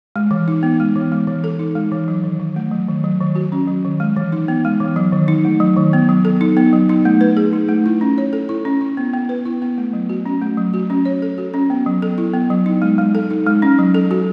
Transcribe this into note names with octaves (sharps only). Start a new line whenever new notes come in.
G#3
E3
D#4
B3
G#3
E3
G#3
E3
A4
D#4
G#3
E3
F#3
D#3
D#3
A3
F#3
D#3
F#3
D#3
F#4
C#4
F#3
D#3
G#3
E3
D#4
B3
G#3
E3
F#3
D#3
D#4
A3
F#3
D#3
B3
F#3
A4
D#4
B3
F#3
D#4
A3
B4
G#4
D#4
A3
E4
C#4
C#5
A4
E4
C#4
E4
B3
B3
B4
E4
B3
A3
F#3
F#4
C#4
A3
F#3
F#4
C#4
C#5
A4
F#4
C#4
B3
F#3
A4
E4
B3
F#3
D#4
G#3
G#3
A4
D#4
G#3
C#4
F#3
A4
F#4